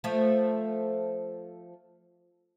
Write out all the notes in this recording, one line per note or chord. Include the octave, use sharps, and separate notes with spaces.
F3 A3